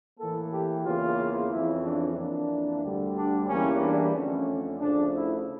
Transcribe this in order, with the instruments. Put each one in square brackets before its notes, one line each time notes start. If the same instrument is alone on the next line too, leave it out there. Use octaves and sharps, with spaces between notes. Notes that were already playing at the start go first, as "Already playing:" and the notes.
[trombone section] A2 E3 A#3 A4
G4
E2 C#3 E3 A#3 F4
F2 C#3 E3 E4
D4
F2 E3 A#3 D4
D2 D3 G3
D4
E2 E3 G3 A#3 C#4
D4
F2 D3 A3 C#4
D2 C#3 F3 A3 D4
E4